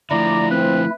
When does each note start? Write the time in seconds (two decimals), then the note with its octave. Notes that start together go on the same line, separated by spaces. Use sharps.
0.11 D3 F3 A3 E4 D5 A#5
0.51 C4 B4